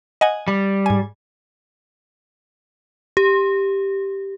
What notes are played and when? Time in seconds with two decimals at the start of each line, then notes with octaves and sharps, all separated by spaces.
0.21 D#5 F#5 G#5
0.48 G3
0.86 G#2 G#5
3.17 G4